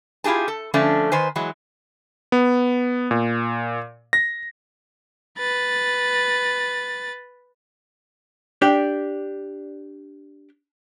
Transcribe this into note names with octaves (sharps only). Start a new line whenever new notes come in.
E4 F4 G4 G#4 A5
A4
D3 F3 A3 C#4 D4 A4
D#3 B4 C5 G#5
E3 F#3 G#3
B3
A#2
A#6
B4 A6
D4 G4 D5